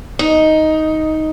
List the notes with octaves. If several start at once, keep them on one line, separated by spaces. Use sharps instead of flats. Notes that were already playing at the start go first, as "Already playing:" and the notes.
D#4